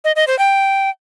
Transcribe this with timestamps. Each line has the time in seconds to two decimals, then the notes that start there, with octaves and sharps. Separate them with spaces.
0.04 D#5
0.16 D#5
0.27 C5
0.39 G5